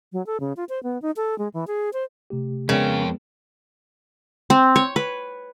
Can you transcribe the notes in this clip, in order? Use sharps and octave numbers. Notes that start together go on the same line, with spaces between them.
F#3
A4
C#3
F4
C5
B3
D#4
A4
G#3
E3
G#4
C5
C3 A3 G4
F2 C#3 G#3 B3 A#4 C#5 G5
C4
C#5
B4